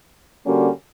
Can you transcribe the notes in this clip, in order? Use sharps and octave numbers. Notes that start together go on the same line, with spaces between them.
D3 G3 A#3 C#4 F#4